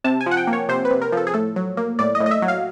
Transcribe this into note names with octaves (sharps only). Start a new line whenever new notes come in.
C3 A5
G#5
F3
F#5
G5
A#3
C#5
C3 C5
B4
C3
A#4
F3 A4
G#4
A2 A4
F#3
A#3
A2 D5
D#5
A2
D#5
E5
F#3
F5